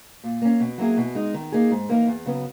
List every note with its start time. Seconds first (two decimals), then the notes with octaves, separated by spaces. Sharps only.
0.24 A#2
0.42 A#3 C#4
0.60 B2
0.78 F#3 A#3 E4 G#4
0.97 B2
1.15 G#3 D#4
1.34 D#3
1.52 A#3 D#4 G#4
1.71 G#2
1.89 E3 A#3 D#4
2.07 E2
2.26 C#3 F#3 B3